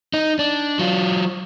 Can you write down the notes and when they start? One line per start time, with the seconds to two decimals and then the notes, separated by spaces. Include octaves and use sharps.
0.14 D#4
0.39 D4
0.79 F#3 F4